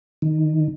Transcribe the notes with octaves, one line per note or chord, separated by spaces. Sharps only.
D#3